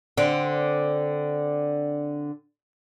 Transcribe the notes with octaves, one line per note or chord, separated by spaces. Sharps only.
D3 C4